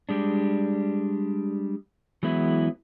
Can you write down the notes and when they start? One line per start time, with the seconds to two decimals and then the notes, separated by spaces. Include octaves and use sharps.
0.09 G3 G#3 D4
2.23 E3 F#3 G#3 B3 E4